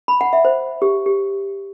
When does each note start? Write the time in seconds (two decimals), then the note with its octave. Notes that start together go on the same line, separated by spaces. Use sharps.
0.08 B5
0.21 F#5
0.33 E5
0.45 C5
0.82 G4
1.06 G4